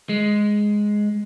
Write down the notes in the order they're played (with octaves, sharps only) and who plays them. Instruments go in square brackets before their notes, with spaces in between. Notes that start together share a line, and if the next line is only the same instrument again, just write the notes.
[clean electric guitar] G#3